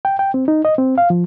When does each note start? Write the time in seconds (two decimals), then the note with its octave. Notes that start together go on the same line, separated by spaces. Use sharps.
0.05 G5
0.19 G5
0.34 C4
0.48 D#4
0.65 D#5
0.78 C4
0.98 F5
1.10 F3